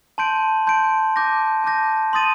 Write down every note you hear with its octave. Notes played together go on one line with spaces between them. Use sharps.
A5 C6 G6 D7
A5 C6 G6 D7
A5 D6 G6 A#6
A5 D6 G6 A#6
C6 D#6 A6 D#7